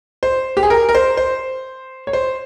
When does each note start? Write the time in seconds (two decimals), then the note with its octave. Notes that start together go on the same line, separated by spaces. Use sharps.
0.23 C5
0.57 G4
0.63 G#4
0.70 A#4
0.89 A#4
0.95 C5
1.17 C5
2.07 C#5
2.13 C5